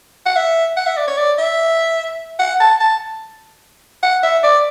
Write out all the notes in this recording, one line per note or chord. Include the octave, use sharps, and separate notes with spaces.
F#5
E5
F#5
E5
D5
C#5
D5
E5
F#5
A5
A5
F#5
E5
D5